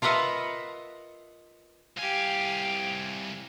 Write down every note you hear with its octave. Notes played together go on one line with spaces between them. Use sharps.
F4 A#4 B4 D#5 E5 F#5
C2 G4 F5 G#5